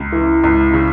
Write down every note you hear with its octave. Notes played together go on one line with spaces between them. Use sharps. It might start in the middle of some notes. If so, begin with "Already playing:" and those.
Already playing: C#2
E3
C#2
C#3